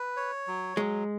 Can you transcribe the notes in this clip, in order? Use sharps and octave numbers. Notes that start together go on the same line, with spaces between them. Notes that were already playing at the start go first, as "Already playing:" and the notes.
Already playing: B4
C#5
F#3
F#3 G#3